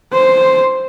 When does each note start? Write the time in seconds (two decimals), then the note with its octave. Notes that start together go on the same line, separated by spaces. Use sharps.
0.13 C5